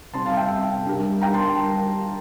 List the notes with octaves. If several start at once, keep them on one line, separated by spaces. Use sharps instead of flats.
C3 G3 C4 A5 C6
F5 A5
E5 G5
G3 D4 G4 A#4
G5 A#5
A5 C6